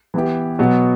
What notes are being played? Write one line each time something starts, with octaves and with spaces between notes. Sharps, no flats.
E3 B3 E4 G4
B2 F#3 B3 F#4